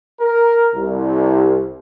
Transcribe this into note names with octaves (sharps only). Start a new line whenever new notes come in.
A#4
C2